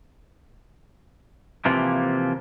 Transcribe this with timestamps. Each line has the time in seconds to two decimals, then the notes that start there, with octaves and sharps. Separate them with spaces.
1.65 C3 E3 F3 A#3